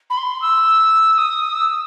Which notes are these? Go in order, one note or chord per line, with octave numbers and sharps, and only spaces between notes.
B5
C6
E6
D#6
E6